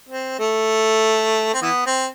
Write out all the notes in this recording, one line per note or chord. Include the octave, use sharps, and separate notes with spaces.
C4
A3
C4
E3 B3
C4